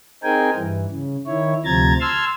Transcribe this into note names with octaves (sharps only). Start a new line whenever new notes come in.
C4 D#4 G#4 A#4 G5 G#5
G2 E3
C#3
D#3 E4 C#5
D2 C3 F3 A#5 G#6 A6
A5 C6 E6 F6 G#6